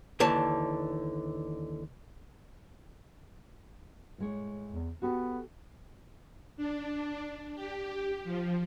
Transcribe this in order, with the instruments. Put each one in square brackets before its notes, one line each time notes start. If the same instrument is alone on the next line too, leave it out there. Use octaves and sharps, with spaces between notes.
[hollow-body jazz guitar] D#2 D3 E3 C#5 A5
[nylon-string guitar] A2 G#3 C#5
[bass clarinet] E2
[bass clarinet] B3 [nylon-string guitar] F#4 G4 A4
[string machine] D4
G4
F3